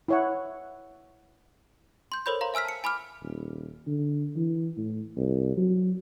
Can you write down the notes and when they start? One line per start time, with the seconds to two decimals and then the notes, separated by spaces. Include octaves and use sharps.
0.08 E4 C#5 F#5
2.12 C6 G6
2.26 A4 A#4 C5 C#5 B5 G6
2.41 F5 A#5 C6
2.54 E5 G#5 E6 F6 B6
2.65 A5 C#7
2.84 G#5 B5 D6 F6
3.22 D#1
3.87 D3
4.36 E3
4.77 A2
5.17 C2
5.57 F#3